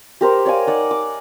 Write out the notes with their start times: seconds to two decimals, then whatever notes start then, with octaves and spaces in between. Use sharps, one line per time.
0.21 G4 A#4 C5 A#5
0.45 C#5 D5 F5 G#5
0.67 D#4 D5 F#5
0.91 D6